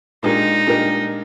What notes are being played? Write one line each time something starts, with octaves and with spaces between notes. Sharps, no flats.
A#2 G#3 D4 D#4 G4 A#4
A#2 G#3 D4 G4 A#4